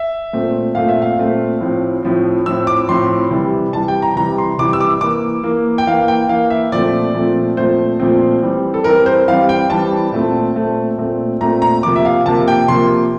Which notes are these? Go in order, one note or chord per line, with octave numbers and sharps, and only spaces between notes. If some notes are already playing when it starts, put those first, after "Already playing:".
Already playing: E5
A#2 A3 C4
A#2 A3 C4 F5
E5
F5
A#2 A3 C4
A2 F3 C4
A2 F3 C4
A2 F3 C4 E6
D6
A2 F3 C4 C6
C3 E3 G3
C3 E3 G3 A5
G5
A#5
C3 E3 G3 A#5
C6
C3 E3 G3 D6
E6
D6
E3 A#3 D6
E3 A#3
G5
E3 A#3 F5
G5
E3 A#3 F5
E5
A#2 F3 A3 C4 D5
A#2 F3 A3 C4
A#2 F3 A3 C4 C5
A#2 F3 A3 C4
E3 G3 C4
A4
E3 G3 C4 A#4
C5
E3 G3 C4 F5
G5
E3 G3 C4 A5
A#2 A3 C4
A#2 A3 C4
A#2 A3 C4
A#2 A3 C4 A#5
A#5
C3 F3 A#3 D6
E5
F5
C3 F3 A#3 A5
G5
C3 F3 A#3 C6